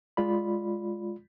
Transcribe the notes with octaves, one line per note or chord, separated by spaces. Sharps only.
G#3 F4 D5 B5